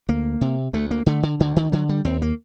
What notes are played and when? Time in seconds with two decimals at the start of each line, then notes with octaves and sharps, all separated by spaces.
0.09 D2 A#3
0.41 C3
0.73 D2 A3
0.91 A#3
1.06 D3 A3
1.23 D3
1.40 D2 D3
1.56 D#3
1.72 D3 F#3
1.89 G3
2.05 D#2 C4
2.22 A#3